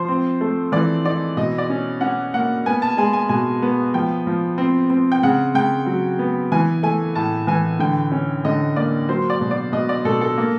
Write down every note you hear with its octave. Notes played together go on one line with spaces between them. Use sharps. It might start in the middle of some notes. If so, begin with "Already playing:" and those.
Already playing: F3 C5
C4
A3
E3 D5
D#4 D5
B2 D#5
D5
C#4
C#4 F#5
A#3 F#5
B3 G#5
A5
G#3 G#5
G#5
B2 G#5
B3
F3 G5
F3
C4
C4
G5
C#3 F#5
C#3 G5
F#3
B3
E3 G#5
A3 G#5
A2 A5
E3 G#5
D3 G5
C#4
D3 D#5
A#3 D5
F#3 C5
D5
B2
D5
B2 D#5
D5
B2 A4
A4
A#3